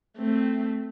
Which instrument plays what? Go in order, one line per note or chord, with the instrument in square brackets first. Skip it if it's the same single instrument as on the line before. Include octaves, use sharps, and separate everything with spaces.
[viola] A3 C4